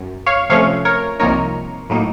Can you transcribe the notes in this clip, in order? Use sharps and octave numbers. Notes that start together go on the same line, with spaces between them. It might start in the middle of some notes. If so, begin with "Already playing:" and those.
Already playing: F#2
C#5 F5
C3 F3 A3 C#4 C#5 F5
A#4 C#5
C2 C3 F3 A#3 D#4 A#4 C#5
A2 F#3 A#3 D#4